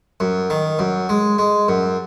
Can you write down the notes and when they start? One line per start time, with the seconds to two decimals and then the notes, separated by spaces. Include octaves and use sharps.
0.20 F#2
0.50 D#3
0.79 F#2
1.09 G#3
1.38 G#3
1.68 F#2